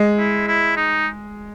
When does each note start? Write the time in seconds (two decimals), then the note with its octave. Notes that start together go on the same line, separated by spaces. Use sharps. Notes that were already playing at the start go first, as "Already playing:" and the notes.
Already playing: G#3
0.18 E4
0.48 E4
0.77 D#4